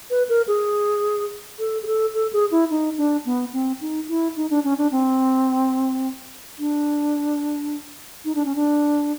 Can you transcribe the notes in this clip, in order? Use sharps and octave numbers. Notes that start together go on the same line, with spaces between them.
B4
A#4
G#4
A4
G#4
A4
A4
G#4
E4
D#4
D4
B3
C4
D#4
E4
D#4
D4
C#4
D4
C4
D4
D#4
D4
C#4
D4